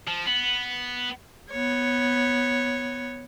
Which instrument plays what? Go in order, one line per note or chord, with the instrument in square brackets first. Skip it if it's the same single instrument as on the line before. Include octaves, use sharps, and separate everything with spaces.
[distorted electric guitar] F3
B3
[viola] B3 C#5